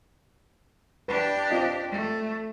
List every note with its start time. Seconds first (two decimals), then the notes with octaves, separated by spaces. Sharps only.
1.08 D4 G4 B4
1.51 C4 F4 D#5
1.91 A3